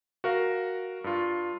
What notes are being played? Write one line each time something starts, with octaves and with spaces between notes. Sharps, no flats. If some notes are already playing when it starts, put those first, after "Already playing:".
F#4 A#4 F5
G2 F4